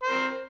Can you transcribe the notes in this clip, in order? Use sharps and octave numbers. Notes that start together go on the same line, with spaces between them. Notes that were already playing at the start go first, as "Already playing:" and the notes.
C4 A#4 C5